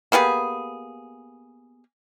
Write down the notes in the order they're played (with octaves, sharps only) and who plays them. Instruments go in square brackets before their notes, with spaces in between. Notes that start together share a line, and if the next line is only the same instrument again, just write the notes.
[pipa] A#3 B3 G4 G#4